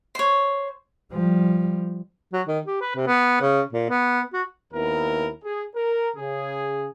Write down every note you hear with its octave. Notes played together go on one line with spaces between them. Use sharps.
C5 C#5
F3 G3
F#3
D#3
G4
B4
C3
B3
C#3
A#2
B3
F#4
D#2 B3 E4 A#4
G#4
A#4
C#3 G#4